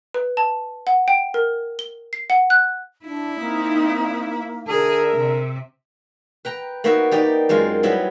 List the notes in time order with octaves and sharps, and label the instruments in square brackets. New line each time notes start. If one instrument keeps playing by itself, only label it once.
[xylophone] B4
A5
F#5
G5
A#4
G7
C7
F#5
F#6
[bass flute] D4 [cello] E4
[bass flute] A#3 [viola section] C4 D#4
[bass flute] D3 [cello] G#4 [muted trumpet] A#4 [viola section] E5
[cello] C3
[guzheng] B4 G5 A#5
A#3 B3 D#4 F#4 E5
D#4 G4 D5
F#2 G#3 C4 F4
F#3 G3 B3 E4